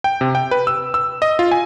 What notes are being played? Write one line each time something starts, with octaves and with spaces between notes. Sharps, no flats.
G5
C3
G5
B4
E6
E6
D#5
F4
G#5